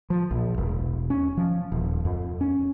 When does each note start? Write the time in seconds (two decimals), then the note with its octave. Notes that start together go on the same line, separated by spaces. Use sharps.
0.10 F3
0.31 A#1
0.58 E1
1.10 C#4
1.37 F3
1.72 D#1
2.05 F2
2.41 C#4